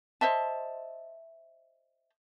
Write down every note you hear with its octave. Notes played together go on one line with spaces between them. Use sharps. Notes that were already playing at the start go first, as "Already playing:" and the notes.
C5 D#5 E5 A5